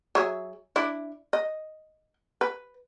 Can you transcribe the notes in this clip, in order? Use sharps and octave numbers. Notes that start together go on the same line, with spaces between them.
F#3 G#4 E5
D4 E4
D#5
B4